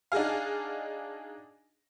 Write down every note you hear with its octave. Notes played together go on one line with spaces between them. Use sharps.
D4 D#4 F#4 G#4 F5